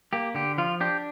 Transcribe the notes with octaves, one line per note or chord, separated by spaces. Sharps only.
A#3 G4
D3 G4
F3 F4
D4 G4